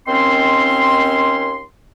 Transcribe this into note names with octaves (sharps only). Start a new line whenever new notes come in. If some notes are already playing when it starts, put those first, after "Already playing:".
D#2 D#3 C4 C#4 C6